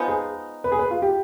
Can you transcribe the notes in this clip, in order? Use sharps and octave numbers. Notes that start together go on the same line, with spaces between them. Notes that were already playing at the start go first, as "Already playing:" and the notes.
Already playing: F3 G#3 B3 D#4
G#4
B4
G#4
B4
F4
G4